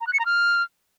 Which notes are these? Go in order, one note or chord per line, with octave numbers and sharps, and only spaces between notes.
A#5
F#6
C#7
A#5
F6